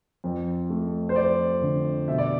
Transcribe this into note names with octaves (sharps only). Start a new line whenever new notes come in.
F2
A3
C5
F2 D5
D3
B2 E5
D5